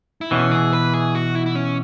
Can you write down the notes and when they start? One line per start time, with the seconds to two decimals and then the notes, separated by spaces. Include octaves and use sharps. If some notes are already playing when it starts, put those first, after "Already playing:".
0.21 E4
0.31 B2 E3 C#4
0.51 G#4
0.73 B4
0.94 G#4
1.15 F#4
1.35 E4
1.46 E4
1.55 C#4